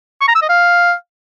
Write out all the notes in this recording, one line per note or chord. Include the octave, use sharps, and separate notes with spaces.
C#6
A#5
E6
D#5
F5